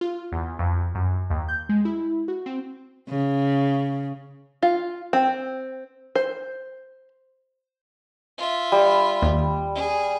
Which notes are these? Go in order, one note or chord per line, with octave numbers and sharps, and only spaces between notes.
F4
E2
F2
F#2
D#2
G6
G#3
E4
F#4
C4
C#3
F4
C4
C5
F4 E5
G3
D#2
G#4